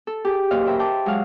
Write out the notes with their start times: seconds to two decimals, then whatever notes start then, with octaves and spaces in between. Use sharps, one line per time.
0.07 A4
0.25 G4 G#4
0.51 F#2 A#2 C5 D#5 F5
0.66 A#4 C5 E5 G5 A#5 B5
0.79 G5 A5 D6
1.06 F#3 G#3 F5 F#5